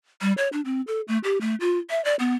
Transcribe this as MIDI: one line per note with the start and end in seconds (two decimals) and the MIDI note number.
0.21 0.33 55
0.37 0.48 73
0.53 0.61 62
0.65 0.81 60
0.87 1.01 69
1.08 1.18 57
1.24 1.38 67
1.41 1.55 57
1.60 1.78 65
1.90 2.03 76
2.05 2.15 74
2.19 2.36 59